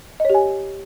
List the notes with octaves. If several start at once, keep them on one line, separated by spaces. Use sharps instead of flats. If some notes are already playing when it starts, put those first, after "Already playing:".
G4 C#5 D#5 G#5